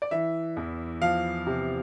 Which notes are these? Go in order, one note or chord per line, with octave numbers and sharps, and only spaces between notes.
D5
E3 E5
E2
F3 F5
C3